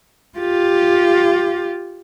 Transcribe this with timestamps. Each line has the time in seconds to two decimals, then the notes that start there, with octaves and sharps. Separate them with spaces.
0.38 F4 G4